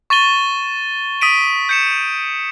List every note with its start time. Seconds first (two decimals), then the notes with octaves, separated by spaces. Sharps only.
0.10 C#6 A6 D#7 G7
1.21 D#6 B6 D7 D#7
1.69 G6 C#7 E7